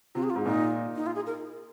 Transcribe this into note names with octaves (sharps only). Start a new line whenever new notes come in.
C3 F4
G#4
F4
G#2
A#2 D#4
D#4
F4
G#4
A#4